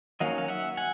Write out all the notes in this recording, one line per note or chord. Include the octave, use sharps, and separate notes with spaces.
D#3 F#3 A#3 C#4 D#5 F5
F5
E5 F#5
F#5 G#5